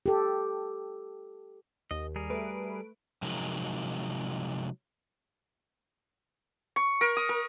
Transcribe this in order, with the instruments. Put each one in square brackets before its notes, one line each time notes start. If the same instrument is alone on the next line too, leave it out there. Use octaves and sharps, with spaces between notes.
[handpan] G4 A4
[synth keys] D#2 [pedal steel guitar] D#5
[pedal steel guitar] G3 G#4 A#4
[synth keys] A3 B4 D7
[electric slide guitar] C3 F3 F#3 G#3 D#4 A#4
[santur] C#6
A#4
D#6
A#4